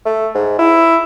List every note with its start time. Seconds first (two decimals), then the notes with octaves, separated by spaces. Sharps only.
0.05 A3
0.35 G#2
0.59 E4